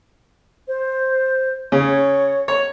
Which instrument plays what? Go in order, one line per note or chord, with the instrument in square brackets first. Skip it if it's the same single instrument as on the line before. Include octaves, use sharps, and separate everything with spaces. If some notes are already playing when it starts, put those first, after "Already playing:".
[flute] C5
[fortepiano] C#3 [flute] C#5
[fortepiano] C#5